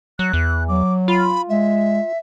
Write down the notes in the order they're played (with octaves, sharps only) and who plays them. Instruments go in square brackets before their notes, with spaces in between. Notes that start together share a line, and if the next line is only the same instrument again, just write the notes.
[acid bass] F#3 [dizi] F#6
[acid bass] E2
[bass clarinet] F#3 [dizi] D6
[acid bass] F4 [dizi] B5
[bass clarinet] G#3 [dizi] E5